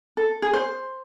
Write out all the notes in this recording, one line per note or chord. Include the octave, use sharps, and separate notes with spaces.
A4
G#4
C5